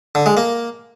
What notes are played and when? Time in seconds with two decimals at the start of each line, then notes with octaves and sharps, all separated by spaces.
0.15 D3
0.26 G#3
0.37 A#3